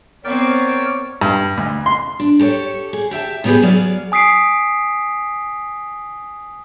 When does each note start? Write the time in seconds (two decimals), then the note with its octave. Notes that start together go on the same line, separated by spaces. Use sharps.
0.24 B3 C4 A#4 C#5 D5 G5
1.21 G2
1.57 D2
1.86 C6
2.20 D4
2.39 G4 A4 B4 C#5
2.93 G#4
3.11 G4 E5 G5 A5
3.44 C3 A3 B3 E4 G4 G#4
3.63 F#3 B3 G#4 D5 F5
4.12 G#5 D#6 B6 C7 D7